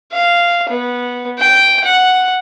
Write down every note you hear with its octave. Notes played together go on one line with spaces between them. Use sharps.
F5
B3
G5
F#5